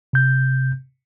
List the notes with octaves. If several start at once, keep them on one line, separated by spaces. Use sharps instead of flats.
C3 G6